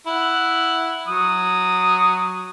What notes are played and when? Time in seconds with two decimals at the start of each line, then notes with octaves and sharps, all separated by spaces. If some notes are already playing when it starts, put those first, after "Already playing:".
0.07 E4 F#5
1.08 F#3 D#6